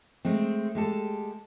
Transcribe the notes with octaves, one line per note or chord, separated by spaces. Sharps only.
G#3 A3 C4
G#3 G4 A4